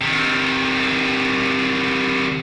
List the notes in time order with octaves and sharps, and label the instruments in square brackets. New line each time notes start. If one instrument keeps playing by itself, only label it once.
[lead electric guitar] C3 D#3